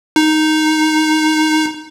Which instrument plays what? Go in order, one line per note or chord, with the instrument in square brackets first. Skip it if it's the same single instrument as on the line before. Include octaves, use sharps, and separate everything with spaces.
[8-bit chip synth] D#4